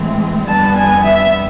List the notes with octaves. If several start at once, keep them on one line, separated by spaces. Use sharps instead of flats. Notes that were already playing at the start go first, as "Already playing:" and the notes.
Already playing: A2 E3 G#3 C4
F2 D3 G3 B3 A5
G#5
E5